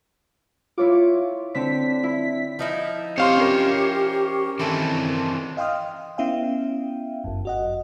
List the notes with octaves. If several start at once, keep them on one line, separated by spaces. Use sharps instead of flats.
E4 F4 C#5 D6
D3 C4 B6
E4
F3 D#4 E4
C4 G4 C5 C#5 F5 C6
C#4 A#4
D#3 E3 C4 D4 E4 A4
D#5 F5 G5 C6 D#6 F6
B3 C#4 E4 E5 F5 G5
G1 F#2
F#4 D#5 F#5